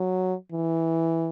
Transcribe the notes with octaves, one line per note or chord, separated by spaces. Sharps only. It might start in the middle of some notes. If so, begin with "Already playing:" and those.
Already playing: F#3
E3